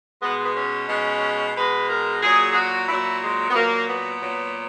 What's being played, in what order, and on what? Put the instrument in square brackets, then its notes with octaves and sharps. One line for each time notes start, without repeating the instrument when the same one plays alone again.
[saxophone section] B2 G#3 B3
B3
C#4
B2 G#3
B2 G#3 B4
A#4
A#2 F#3 G#4
G#4
F#4
A#2 F#3 E4
G#3
B3
A#2 F#3 A#3
B3
A#2 F#3